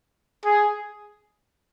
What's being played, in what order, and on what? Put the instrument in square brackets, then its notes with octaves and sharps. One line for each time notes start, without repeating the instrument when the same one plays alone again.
[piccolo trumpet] G#4